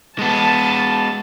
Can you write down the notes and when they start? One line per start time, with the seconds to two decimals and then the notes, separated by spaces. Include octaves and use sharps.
0.19 G#3 B3 A5